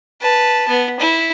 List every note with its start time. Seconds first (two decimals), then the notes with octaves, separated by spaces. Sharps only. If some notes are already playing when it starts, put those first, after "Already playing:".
0.21 B4 A5
0.68 B3
0.99 E4